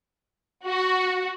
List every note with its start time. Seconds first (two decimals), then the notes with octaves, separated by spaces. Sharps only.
0.65 F#4